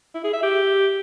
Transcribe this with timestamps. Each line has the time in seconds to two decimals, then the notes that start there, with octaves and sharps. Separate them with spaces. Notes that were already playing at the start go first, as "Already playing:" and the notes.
0.15 E4
0.24 G#4
0.33 E5
0.43 G4